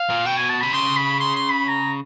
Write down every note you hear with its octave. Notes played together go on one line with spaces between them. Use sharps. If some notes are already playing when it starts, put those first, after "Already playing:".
Already playing: F5
A#2
B2 G5
G#5
A5
C3 B5
C#3 C6
B5
C6
C6
B5
A#5